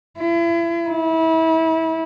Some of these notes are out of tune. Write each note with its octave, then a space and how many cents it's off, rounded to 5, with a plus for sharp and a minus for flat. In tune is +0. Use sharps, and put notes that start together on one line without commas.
E4 +35
E4 -30